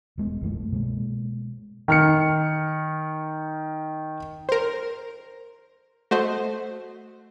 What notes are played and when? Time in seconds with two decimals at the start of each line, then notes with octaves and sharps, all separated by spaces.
0.18 E1 G#3 B3
0.41 C2 F#2 E3 A3
0.72 B2 G#3 A#3
1.88 D#3 F6 C#7
4.49 A#4 C5
6.11 A3 F#4 C5 D#5